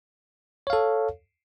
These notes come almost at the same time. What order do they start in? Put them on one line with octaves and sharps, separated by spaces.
C#5 F5 A4